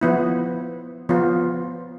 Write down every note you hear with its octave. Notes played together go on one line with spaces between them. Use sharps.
F3 B3 E4
F3 B3 F4